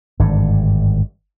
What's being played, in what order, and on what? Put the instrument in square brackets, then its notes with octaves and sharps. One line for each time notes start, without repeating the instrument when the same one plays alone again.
[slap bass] G#1 G2 D3